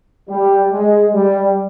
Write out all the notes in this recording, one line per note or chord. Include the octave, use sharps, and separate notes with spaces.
G3
G#3
G3